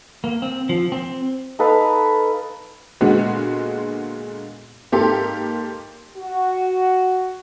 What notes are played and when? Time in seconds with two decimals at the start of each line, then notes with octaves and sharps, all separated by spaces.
0.24 A#3
0.42 C4
0.69 F3
0.92 C4
1.59 D#4 A4 B4 F5
3.01 A#2 D3 G#3 B3 F#4
4.92 G#2 A#3 G4 A4 C6
6.17 F#4